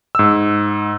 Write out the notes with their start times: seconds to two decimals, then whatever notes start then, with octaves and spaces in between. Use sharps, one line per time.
0.15 G#2 E6